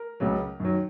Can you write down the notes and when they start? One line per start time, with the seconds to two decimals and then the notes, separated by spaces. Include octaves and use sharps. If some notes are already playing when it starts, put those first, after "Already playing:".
Already playing: A#4
0.20 C#2 C#3 F#3
0.60 F#2 D#3 F#3